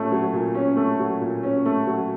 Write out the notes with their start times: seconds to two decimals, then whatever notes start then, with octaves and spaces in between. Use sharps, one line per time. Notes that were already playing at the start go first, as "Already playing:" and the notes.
Already playing: A#2 A3 C#4
0.12 F#3
0.33 A#2
0.55 C#4
0.77 A3
1.00 F#3
1.21 A#2
1.43 C#4
1.65 A3
1.87 F#3